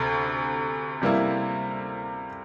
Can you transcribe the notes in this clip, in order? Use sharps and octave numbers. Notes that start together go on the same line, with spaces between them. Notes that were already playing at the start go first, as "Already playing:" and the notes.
Already playing: D2 C3
C3 G3 A#3 E4